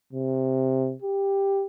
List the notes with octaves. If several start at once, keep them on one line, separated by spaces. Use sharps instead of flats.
C3
G4